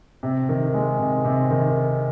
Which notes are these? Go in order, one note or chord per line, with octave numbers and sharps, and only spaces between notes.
C3
D#3
G#3
C3
C3
D#3